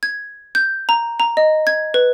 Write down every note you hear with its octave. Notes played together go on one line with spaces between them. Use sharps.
G#6
G6
A#5
A#5
D#5
G#6
B4